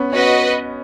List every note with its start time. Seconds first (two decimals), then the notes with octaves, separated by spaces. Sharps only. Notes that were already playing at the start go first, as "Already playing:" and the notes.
Already playing: B3 C#4
0.12 C#4 F#4 B4 D#5